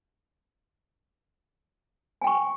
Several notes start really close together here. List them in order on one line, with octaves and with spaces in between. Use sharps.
G#5 G5 C#6